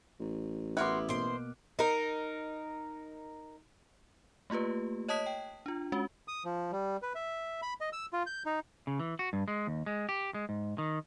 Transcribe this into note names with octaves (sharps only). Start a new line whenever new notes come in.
A1
B3 E4 F#4 A#4 C6 D6 F6 F#6
B2 A#3 C5 C6 D7
D#4 A#4
A3 A#3 F4 G4 B4
C#5 D#5 A5 D#6 B6
G5
D4 F4
G#3 C#4 F#4
D#6
F3
G3
B4
E5
B5
D#5
E6
F4
G6
D#4
C#3
E3
F#4
G2
G#3
D#2
G#3
G4
G#3
G#2
D#3